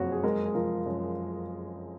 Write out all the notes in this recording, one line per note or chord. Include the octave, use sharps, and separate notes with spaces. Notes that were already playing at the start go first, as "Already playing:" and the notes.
Already playing: F#1 F2 F#4 C#5
G#4
G#3 A#4
G#4
F3 A#4
F#2